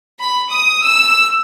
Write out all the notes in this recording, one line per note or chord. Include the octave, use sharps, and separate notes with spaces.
B5
D#6
E6